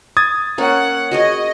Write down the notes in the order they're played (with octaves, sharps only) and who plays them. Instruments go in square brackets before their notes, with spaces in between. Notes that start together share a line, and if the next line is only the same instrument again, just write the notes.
[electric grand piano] D#6 G#6 A6
[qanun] A#3 C#4 [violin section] F#5
[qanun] F#4 G#4 C#5 [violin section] D#5